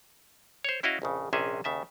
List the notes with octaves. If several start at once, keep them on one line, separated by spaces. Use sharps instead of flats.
C5 C#5
C#4 E4 F#4 D#5 F5
A#1 F2 C#3
A#1 C3 C#4 G#4 D#5 E5
D#2 C#3 E5 A5